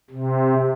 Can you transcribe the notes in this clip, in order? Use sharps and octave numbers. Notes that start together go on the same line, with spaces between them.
C3